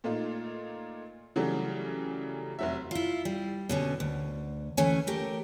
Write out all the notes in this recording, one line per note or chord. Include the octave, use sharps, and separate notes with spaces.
A#2 A3 D#4 F4
C#3 E3 F#3 G3 A3
F1 F#3 E5
E4 F4
G3
B2 D3 C#4
D2
D2 E3 A3 C#4 G#5
A3 G4 A#4